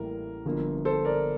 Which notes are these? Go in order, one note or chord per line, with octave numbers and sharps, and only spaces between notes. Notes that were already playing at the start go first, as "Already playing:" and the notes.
Already playing: A1 A2 E3 G3 A#3 A#4
G1 G2 F3 A#3
A4 C5
A#4 D5